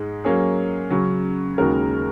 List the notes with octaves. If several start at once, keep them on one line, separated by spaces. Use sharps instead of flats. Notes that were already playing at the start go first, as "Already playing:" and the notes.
Already playing: G#2 G#3
F#3 A#3 C#4 G#4 C#5
C#3 F#3 C#4
D#2 C#3 G#3 F#4 A#4